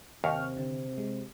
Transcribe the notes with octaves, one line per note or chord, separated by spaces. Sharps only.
D#2 C3 G5 C#6 F6
D3 C4
G#3